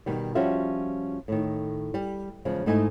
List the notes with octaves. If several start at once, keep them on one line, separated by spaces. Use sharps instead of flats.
B2 D#3 G3
F3 G3 C#4 F4 F#4 E5
A2 D#3
G3
E2 C#3 F3 G#3
G#2 A3 D#4 E4 D#5 G#5